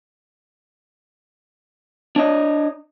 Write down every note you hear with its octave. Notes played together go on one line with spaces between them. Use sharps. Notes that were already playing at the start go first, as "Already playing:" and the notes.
D4 C#5 D#5